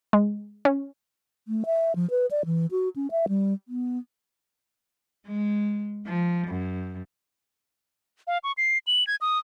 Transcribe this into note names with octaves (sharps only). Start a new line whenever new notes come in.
G#3
C#4
A3
E5
F3
B4
D5
E3
F#4
C#4
E5
G3
B3
G#3
F3
F#2
F5
C#6
C7
F#7
G#6
D#6